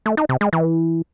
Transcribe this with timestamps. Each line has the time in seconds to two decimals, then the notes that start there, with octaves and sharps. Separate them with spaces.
0.06 A3
0.17 D#4
0.29 C3
0.41 G#3
0.53 E3